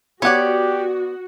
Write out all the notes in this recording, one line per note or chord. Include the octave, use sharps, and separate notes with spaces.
B3 F#4 G4 C#5 D5 F#5